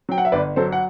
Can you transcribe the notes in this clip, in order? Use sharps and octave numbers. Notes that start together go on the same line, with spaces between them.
F#3 G5
F#5
E5
G1 B4 D5
F#3 A4 C5
F#5